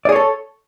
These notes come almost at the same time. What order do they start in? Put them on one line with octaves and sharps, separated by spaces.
D5 G#4 C#5 A4